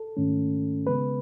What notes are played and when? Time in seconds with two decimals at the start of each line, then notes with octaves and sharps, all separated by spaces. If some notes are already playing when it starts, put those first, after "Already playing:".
Already playing: A4
0.17 G#2 D#3 A3 C#4
0.87 C#3 G#3 B3 B4